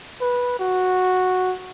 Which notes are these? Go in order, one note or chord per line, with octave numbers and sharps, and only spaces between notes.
B4
F#4